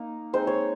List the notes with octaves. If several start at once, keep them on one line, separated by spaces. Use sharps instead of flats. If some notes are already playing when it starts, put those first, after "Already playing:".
Already playing: A#3 D#4
G#3 C4 D#4 C5
C#5